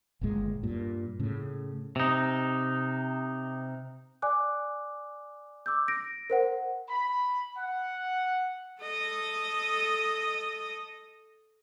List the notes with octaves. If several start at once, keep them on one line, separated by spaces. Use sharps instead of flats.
G1 D#2 A#2 G#3
G2 A#2
A2 C#3
C3 D#4
D5 G#5 D6 F#6
D6 E6 G6
A#6 D7
A#4 C5 F#5
B5
F#5
A4 D#5